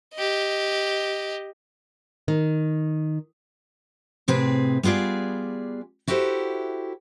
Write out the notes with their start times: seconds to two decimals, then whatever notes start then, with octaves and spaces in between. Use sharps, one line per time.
0.14 G4 D#5
2.28 D#3
4.28 A2 C3 C4 G#4 B4
4.83 G3 B3 F4 G#4 D5
6.07 E4 F#4 G4 A4 C5